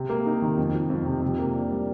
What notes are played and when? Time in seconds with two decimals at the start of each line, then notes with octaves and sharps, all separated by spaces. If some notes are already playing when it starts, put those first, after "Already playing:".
Already playing: C3
0.10 A#3
0.26 D#4
0.42 D#3
0.57 F2
0.74 F3
0.90 F2
1.06 C3
1.22 C3
1.39 A#3
1.55 D4
1.71 G3